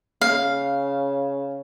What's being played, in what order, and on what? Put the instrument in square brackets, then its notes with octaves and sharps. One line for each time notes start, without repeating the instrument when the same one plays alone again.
[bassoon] C#3 [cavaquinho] F5